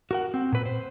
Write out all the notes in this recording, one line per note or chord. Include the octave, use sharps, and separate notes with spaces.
F#4 A#4 F#5
C4
A#2 B4
C5